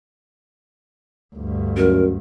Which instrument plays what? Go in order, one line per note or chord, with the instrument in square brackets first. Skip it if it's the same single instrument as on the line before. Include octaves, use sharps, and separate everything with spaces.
[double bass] D2 G2
[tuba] F#2 [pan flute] A#4